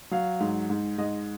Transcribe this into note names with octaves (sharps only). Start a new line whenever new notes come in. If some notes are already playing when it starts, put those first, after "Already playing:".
F#3 F5
G#2
G#2
G#2 D#5